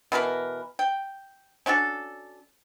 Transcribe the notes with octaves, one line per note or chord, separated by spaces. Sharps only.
B2 E3 A#4 B4
G5
C#4 D4 F#4 A4